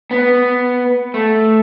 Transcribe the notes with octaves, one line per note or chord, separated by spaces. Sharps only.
B3
A3